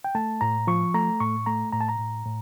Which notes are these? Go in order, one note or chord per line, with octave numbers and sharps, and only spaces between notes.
G5
A3 A5
A2 A#5
F3 C#6
A3 A#5
A2 C#6
A3 A#5
A2 A#5
A5
A#5
A2
A2